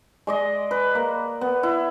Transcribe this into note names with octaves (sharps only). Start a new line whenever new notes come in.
G#3 D5 D#5
B4
A#3
B3
E4